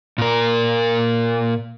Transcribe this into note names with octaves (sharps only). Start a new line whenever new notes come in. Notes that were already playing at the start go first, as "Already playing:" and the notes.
A#2 A#4